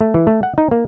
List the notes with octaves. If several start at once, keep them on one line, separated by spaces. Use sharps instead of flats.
A3
E3
A3
F#5
D#4
A#3